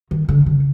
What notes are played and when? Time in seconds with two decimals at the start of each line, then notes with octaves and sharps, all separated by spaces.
0.11 D#3
0.29 D3
0.46 C#3